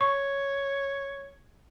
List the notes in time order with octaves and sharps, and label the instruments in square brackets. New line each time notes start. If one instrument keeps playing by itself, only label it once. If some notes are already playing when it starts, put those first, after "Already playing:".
[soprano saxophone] C#5 [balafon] C#6